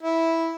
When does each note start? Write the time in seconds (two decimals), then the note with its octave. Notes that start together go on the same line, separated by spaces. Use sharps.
0.03 E4